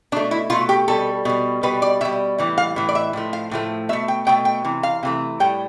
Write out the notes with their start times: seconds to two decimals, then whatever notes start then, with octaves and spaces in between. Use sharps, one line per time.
0.12 B2 D4
0.16 A3
0.31 E4
0.50 B2 A3 F4
0.69 G4
0.88 B2 G3 A4
1.25 B2 G3
1.63 B2 G3 B4
1.82 D5
2.01 B2 E5
2.05 G3
2.38 A2 E3 G3
2.58 F5
2.76 A2 E3
2.89 D5
2.95 E5
3.13 A2 F3 A3
3.33 F5
3.51 A2 F3 A3
3.89 B2 E5
3.93 A3
4.08 G5
4.27 B2 A3 G5
4.45 G5
4.65 C3 E3
4.83 F5
5.03 C3 E3 A3
5.40 A2 G3 G5